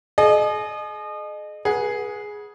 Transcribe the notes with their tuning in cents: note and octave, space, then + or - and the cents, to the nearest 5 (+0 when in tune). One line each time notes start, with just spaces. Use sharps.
G#4 +40 D#5 -30
G#4 +0 B4 -35 F#5 +0